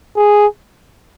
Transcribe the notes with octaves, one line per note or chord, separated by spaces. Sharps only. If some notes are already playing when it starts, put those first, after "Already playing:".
G#4